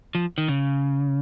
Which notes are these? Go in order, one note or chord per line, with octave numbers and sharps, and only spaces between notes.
F3
D#3
C#3